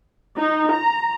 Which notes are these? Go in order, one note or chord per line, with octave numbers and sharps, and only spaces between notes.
D#4
A#5